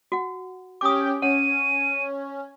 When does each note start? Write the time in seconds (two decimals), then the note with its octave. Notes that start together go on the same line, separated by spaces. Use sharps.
0.12 F#4 F#5
0.81 C#4 G4 G5 D6 D#6
1.22 C#4 C#5 F#5 D#7